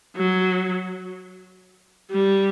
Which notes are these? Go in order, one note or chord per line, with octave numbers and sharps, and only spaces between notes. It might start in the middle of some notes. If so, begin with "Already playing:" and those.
F#3
G3